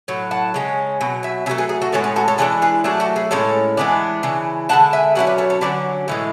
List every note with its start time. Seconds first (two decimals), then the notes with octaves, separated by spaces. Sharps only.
0.08 A2 F#3
0.31 F#5 A5
0.54 C#3 G#3 C#4
1.01 B2 F#3
1.23 E5 G#5
1.46 C#3 E5 G#5
1.49 F#3 A3
1.58 G#4 B4
1.69 G#4
1.82 F#4 A4
1.92 A2 G#3 B3 A4 C#5
2.04 G#4
2.16 F#4 A4
2.28 A4 C#5
2.38 E3 G#3 D4 A4 C#5
2.62 G#4 B4
2.84 F#3 A3 D4 G#4
3.00 F#4 A4
3.16 G#4 B4
3.31 A2 G#3 C#4 A4 C#5
3.77 E3 G#3 B3 D4
4.23 C#3 E3
4.69 D3 G#3 B3 D4 F#5 A5
4.93 E5 G#5
5.15 B2 F#3 C#4 E4 F#5
5.27 B4 D5
5.38 A4 C#5
5.50 A4 C#5
5.61 D3 F#3 C#4 B4 D5
6.08 A2 E3 G#3